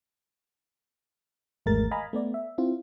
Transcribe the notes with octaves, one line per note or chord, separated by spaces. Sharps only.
G#1 E2 G#3 A3 A#4 A6
D#5 F5 G#5 A#5 B5
A3 B3 D5
E5
C4 E4 F4